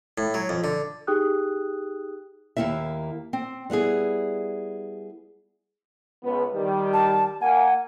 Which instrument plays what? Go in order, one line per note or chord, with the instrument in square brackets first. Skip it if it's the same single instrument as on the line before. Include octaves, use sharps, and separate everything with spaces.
[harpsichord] A2
F#3
F2
D3
[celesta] D#4 G4 G#4 G5 D#6 F#6
[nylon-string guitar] D#2 C#3 A#3 E4 E5
C4
G3 B3 E4 G#4
[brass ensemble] C#2 B3
D#3 G3
[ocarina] A5
[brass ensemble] A#3 G#5 [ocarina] F#5